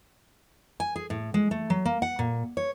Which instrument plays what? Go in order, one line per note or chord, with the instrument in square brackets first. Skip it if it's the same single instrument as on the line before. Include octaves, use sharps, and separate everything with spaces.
[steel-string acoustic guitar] G#5
G#4
A2
G#3
A3
F#3
A#3
F#5
A#2
C#5